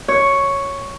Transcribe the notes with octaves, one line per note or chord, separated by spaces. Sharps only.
C#5